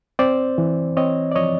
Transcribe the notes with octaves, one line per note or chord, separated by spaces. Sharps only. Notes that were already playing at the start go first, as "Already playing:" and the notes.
C4 C5 D5
E3
C4 C#5 D#5
D5
F3 C#5 D#5